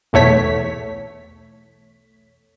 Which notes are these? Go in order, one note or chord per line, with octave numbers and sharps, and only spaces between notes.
B1 E2 A3 C#5 B6